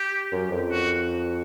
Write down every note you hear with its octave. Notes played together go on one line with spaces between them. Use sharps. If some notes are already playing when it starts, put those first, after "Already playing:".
Already playing: G4
F#2
F2
F#4